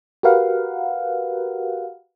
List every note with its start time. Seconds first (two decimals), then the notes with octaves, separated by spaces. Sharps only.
0.23 F#4 G4 A#4 B4 F5 F#5